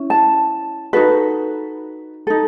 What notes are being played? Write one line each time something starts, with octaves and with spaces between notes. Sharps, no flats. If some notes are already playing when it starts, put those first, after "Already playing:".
Already playing: C#4 E4
A5
D#4 F#4 A4 B4
D#4 A4